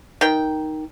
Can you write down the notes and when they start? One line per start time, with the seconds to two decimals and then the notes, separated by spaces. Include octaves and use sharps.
0.21 D#3 G5